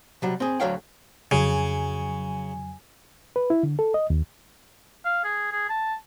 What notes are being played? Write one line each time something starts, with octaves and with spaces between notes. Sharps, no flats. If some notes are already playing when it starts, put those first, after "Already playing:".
C3 F#3 G3
C4 G#4
D2 F#3 A4 C#5 F5 G5
F2 C#3 F#3 G#5
B4
E4
D3
A4
D#5
D#2
F5
G#4
G#4
A5